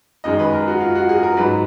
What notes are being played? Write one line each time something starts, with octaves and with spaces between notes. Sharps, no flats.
F#2 D#3 G#3 D#5
B4
A#4
F#4
F4
F#4
G#4
A#4
G#2 F#3 B4